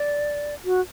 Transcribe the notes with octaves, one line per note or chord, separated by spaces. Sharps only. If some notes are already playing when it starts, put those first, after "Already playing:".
Already playing: D5
F#4